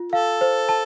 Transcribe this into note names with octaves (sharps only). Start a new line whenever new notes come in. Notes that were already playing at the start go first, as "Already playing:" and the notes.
Already playing: F4
A4 F5
C5
A5